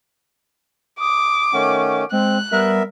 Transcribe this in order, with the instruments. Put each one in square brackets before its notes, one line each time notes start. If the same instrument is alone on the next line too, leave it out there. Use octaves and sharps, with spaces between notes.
[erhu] D6 [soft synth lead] D#6
[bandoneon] D#3 A3 C#4 [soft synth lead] F#5
[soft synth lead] G#3 [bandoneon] C4 [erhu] F#6
[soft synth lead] G3 [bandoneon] B3 A#4 E5